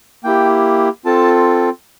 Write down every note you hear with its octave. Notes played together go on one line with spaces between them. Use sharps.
A#3 E4 G4 G5
C4 F4 A4 A5